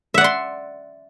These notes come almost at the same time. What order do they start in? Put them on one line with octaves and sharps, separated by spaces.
E5 F#5 D5 C6